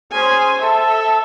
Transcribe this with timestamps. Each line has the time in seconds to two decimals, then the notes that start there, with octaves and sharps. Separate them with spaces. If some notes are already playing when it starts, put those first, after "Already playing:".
0.12 C#4 G#4 C5 G#5
0.61 A4 E5